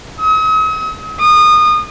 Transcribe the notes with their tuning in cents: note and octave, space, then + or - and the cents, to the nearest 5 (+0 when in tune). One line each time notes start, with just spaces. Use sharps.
D#6 +45
D#6 -25